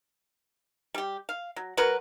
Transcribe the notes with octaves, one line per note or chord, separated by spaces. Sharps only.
G3 G4
F5
F#3
F#3 F#4 A#4 B4